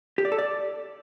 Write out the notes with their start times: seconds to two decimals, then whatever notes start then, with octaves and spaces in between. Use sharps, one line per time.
0.18 G4
0.25 D5
0.32 A4
0.39 D5